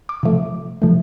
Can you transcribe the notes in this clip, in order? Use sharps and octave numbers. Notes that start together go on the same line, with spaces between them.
D6
C3 F3 A3
C3 F3 A3